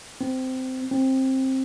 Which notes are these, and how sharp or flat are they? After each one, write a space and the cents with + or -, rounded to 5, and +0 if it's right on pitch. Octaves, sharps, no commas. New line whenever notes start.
C4 -15
C4 +15